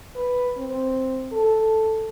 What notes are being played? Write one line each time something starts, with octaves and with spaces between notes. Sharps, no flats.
B4
C4
A4